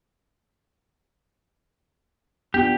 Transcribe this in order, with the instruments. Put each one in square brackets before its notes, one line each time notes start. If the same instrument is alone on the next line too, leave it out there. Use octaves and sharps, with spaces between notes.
[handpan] B3 D4 F4 [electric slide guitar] G4